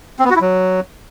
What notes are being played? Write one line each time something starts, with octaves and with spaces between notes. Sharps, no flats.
C4
B3
F#4
E4
F#3